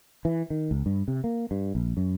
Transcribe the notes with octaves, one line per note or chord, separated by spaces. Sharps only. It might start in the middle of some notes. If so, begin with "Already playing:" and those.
E3
D#3
C#2
G2
C3
A#3
G2
A#1
F#2